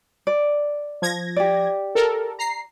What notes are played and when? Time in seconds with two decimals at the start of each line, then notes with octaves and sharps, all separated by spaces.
0.27 D5
1.02 F3 G#6 A#6
1.36 G4 D5
1.95 A4 A#4
2.39 A#5 C7